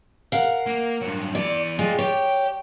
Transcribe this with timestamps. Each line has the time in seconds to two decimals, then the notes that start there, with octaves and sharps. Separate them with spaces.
0.32 A#4 F5 F#5
0.66 A#3
1.01 G2 F#3
1.35 E3 B3 D5
1.79 G#3 F4 G4
1.99 G4 C#5 G5